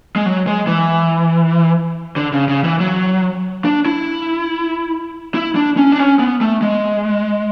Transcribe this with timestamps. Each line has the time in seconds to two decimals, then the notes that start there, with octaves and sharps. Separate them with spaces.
0.16 G#3
0.26 F#3
0.47 G#3
0.67 E3
2.16 D3
2.33 C#3
2.49 C#3
2.64 E3
2.80 F#3
3.65 D4
3.86 E4
5.34 E4
5.56 D4
5.77 C#4
5.92 D4
5.98 C#4
6.19 B3
6.41 A3
6.62 G#3